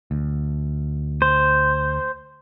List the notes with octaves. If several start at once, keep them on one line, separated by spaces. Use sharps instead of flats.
D2
C5